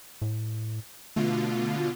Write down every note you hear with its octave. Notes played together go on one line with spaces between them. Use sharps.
A2
B2 D3 A3 F4